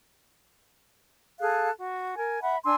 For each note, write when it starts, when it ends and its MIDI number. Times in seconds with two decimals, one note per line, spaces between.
1.40 1.69 68
1.40 1.69 69
1.40 1.69 77
1.40 1.69 90
1.78 2.14 66
2.16 2.41 70
2.16 2.41 80
2.42 2.56 76
2.42 2.56 78
2.42 2.56 83
2.63 2.75 62
2.63 2.75 80
2.63 2.75 84
2.63 2.75 88